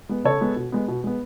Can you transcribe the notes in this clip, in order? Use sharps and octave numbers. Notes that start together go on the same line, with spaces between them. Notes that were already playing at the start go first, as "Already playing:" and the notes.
G#3 B3
C#3 A4 C#5
G#3 B3
B2
G#3 B3
B2
G#3 B3